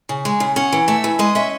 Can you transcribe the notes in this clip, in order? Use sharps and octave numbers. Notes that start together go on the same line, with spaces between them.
C#3
G#3
C#3
C#4 F#5
E3
A3 E5
E3
G#3 D#5
C#4 E5